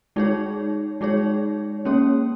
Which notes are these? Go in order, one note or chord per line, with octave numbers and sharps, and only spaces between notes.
G#3 D#4 G#4 C#5
G#3 D#4 G#4 C#5
A#3 C#4 G#4 C#5